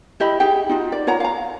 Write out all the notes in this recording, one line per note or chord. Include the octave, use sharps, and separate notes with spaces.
E4 G4 D#5 B5
D#4 G4 G#4 G5
D#4 F4 F#4
D5
F4 C#5 F#5 A#5
F5 A#5